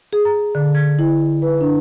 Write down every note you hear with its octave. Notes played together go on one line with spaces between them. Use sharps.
G#4
A#5
D3
G#6
E4
B4
D4